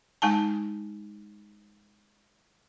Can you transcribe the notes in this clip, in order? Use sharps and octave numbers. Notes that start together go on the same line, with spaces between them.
G#3 D#4 G#5 A5